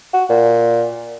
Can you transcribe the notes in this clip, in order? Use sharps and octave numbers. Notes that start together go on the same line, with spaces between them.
F#4
A#2